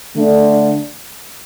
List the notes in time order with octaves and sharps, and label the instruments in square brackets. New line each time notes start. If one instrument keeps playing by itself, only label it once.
[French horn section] D3 A3 D4